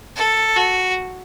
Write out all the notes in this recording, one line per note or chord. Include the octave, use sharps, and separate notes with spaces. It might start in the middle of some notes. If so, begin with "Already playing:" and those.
A4
F#4